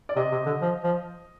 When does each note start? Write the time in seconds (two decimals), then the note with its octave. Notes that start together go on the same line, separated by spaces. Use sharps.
0.09 D5
0.16 C3 D#5
0.32 C3
0.46 D3
0.62 F3
0.84 F3